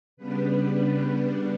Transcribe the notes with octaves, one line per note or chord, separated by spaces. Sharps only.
C#3 G3 B3 D4 B4